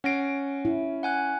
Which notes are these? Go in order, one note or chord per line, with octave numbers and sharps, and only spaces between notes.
C#4 F#5 A#6 C7 D7
E4
F#5 G#5 F#6